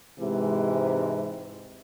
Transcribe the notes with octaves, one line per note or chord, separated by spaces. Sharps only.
G#2 C3 E3 G#3